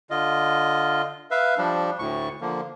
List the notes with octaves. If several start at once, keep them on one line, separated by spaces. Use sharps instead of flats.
D3 F4 D#5
B4 E5 F5
F3 G3 D4
D2 A2 C#6
D3 F3 A#3